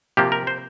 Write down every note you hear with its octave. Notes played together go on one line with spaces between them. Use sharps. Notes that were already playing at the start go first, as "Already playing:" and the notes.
C3 F3 A#3 G4
A#4
C5